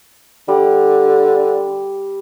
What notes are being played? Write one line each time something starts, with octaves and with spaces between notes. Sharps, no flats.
D3 G3